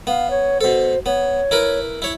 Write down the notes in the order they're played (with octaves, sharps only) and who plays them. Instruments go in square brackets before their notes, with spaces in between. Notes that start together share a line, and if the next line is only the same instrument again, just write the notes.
[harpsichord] B3 [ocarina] F5
[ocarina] C#5
[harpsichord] B2 A4 [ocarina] C5
[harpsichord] B3 [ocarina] C#5
[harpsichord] E4 A#4 B4
E4 C#5